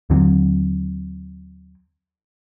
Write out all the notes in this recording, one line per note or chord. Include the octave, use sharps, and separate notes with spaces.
D#2 D3 F#3 C4